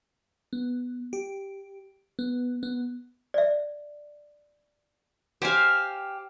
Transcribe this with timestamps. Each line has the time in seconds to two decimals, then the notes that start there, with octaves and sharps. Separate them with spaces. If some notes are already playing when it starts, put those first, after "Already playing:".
0.53 B3
1.13 G4
2.19 B3
2.63 B3
3.34 D5 E5
5.42 G4 C5 F5 G#5